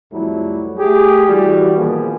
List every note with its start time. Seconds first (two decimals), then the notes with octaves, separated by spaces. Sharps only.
0.12 C2 F2 F#3 G3 A3 E4
0.78 A3 G4 G#4
1.26 E3 G3 F#4
1.77 A#2 D#3 F3 A#3 B3 G#4